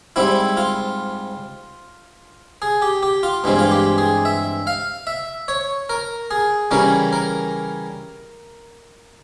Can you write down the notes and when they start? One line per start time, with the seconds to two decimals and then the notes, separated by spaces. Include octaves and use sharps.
0.16 G#2 G3 C4 E4
0.57 F4
2.62 G#4
2.82 G4
3.03 G4
3.23 F4
3.44 G2 E3 G#3 C4
3.59 F4
3.71 G4
3.98 G#4
4.25 E5
4.67 F5
5.07 E5
5.48 C#5
5.90 A#4
6.31 G#4
6.71 C#3 E3 G3 C#4 A#4
7.13 A#4